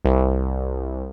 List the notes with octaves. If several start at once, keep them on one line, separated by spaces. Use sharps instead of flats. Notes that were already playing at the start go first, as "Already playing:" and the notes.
C2